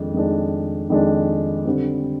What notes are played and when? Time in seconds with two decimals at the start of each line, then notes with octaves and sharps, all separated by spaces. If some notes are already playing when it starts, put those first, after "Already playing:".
Already playing: F2 D#3 G#3 D4
0.14 F2 D#3 G#3 D4
0.90 F2 D#3 G#3 D4
1.65 D3 G3 C4